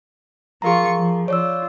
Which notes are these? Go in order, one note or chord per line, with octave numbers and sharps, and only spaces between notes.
F3 F4 G#4 A#4 A#5 C#6
F3
F4 C#5 D5 E6